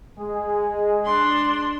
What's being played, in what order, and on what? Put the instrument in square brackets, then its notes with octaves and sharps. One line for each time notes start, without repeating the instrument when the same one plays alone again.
[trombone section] G#3 G#4
[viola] D4 C6